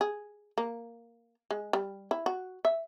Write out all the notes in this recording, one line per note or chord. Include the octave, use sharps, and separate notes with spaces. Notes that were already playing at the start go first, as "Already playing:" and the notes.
G#4
A#3
G#3
G3
E4
F#4
E5